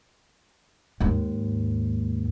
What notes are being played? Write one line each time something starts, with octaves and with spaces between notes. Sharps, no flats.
D#2 G#2